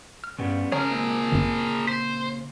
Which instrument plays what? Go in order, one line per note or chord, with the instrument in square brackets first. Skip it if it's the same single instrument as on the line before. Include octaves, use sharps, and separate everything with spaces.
[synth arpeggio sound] F6
[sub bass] G2 [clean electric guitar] C#3 G3 B3
[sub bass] C#3 [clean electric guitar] C#4 A#5 [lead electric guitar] G#4 A#4 [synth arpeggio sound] C#5
[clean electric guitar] A#2 C4
[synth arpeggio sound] G1 F#2
[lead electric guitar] C5 [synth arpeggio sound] B6